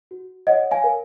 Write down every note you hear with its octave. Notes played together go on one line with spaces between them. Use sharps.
F#4
C#5 D#5 F#5
F5 G#5
A#4